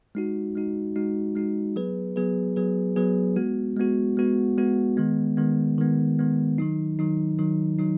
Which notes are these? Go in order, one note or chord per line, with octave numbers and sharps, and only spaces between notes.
G#3 D#4 F#4
G#3 D#4 F#4
G#3 D#4 F#4
G#3 D#4 F#4
F#3 B3 G#4 B4
F#3 B3 G#4 B4
F#3 B3 G#4 B4
F#3 B3 G#4 B4
G#3 B3 F#4
G#3 B3 F#4
G#3 B3 F#4
G#3 B3 F#4
D#3 G#3 B3
D#3 G#3 B3
D#3 G#3 B3
D#3 G#3 B3
D#3 F#3 D#4
D#3 F#3 D#4
D#3 F#3 D#4
D#3 F#3 D#4